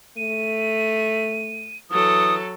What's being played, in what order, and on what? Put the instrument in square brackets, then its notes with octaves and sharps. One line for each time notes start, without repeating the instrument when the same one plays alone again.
[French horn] A3 [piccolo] D#7
[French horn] E3 [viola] F#3 A4 [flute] D#6